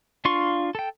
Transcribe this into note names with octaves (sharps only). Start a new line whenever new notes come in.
D4 F4 F5 C6 C#6
A4 G5